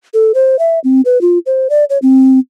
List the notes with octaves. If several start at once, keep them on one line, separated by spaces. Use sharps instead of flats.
A4
C5
E5
C4
B4
F4
C5
D5
C#5
C4